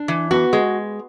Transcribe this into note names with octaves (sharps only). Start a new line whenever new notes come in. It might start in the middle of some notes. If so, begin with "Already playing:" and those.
Already playing: D4
E3
B3 F#4
G#3